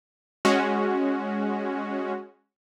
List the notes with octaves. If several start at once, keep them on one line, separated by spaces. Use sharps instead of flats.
G#3 C#4 F#4